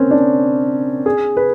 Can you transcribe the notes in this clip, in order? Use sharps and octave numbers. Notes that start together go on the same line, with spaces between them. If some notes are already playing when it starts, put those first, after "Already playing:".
Already playing: A#3 C4 C#4
D4
G#4
B4